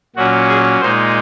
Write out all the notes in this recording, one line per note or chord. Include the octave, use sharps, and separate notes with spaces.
A#2 F#3 C#4 F#4
G#4
A#2 G#3 D#4 C5